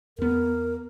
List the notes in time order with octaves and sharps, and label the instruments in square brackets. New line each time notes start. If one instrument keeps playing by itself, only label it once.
[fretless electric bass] E2 B3 [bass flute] A#4